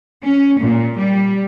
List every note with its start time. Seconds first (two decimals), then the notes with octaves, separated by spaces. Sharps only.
0.24 C#4
0.59 A#2
0.97 G3